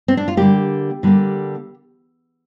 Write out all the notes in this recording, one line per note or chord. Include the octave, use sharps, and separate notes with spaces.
C4
D4
F4
D3 G3 A#3 G4
D3 G3 A#3